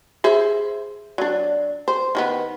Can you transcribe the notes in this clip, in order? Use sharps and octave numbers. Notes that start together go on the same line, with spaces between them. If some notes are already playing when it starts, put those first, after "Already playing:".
G#4 C5 E5
F#3 D4
C5
D#3 G3 B3